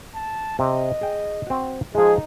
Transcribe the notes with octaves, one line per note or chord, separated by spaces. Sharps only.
A5
C3 D#5
G#4 G5
C4 F#4
F3 G#3 D#4 G#4